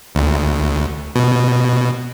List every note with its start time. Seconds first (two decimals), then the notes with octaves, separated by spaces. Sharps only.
0.15 D2
1.15 B2